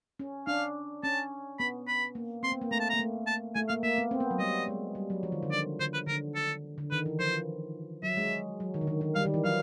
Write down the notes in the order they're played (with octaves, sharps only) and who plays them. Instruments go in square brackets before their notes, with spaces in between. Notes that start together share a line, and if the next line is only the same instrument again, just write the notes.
[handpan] C#4
[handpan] D4 [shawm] F5
[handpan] C#4 [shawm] A5
[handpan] B3 [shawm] B5
[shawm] B5
[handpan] A#3
[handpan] C4 [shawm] C6
[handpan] B3
A#3
[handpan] A3 [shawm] A#5
[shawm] A5
[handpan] A#3 [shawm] A#5
[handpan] A3
[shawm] A5
[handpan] A3 [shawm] G#5
[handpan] A#3 [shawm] F5
[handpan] A#3 [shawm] E5
[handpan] B3
C4
B3
F#3
[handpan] G3 [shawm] D#5
[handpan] G#3
G3
F#3
F3
D#3
D3
[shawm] D5
[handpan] D3 [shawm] C5
[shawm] B4
[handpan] D3 [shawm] A#4
[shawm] A4
[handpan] D3
[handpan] D#3 [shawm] B4
[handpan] E3
[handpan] F3 [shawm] C5
[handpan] F#3 [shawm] E5
[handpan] G#3
F#3
D#3
D3
D#3
D#3
[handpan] G3 [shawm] F5
[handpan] D#3
E3
[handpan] F#3 [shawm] F5